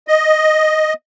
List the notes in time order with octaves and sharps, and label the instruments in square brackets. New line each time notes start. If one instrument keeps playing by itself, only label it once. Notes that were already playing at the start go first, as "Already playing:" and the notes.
[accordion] D#5